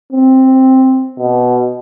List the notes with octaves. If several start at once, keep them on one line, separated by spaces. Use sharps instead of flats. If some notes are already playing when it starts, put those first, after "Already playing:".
C4
B2